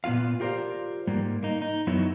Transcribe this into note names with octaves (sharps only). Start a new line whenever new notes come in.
A#2 B3 E4 F4 F5
F4 G4 A#4 C5 D5 F5
G#2 G3 A#3
A#3 D#4
D#4
F#2 F#3 B3 D#4 E4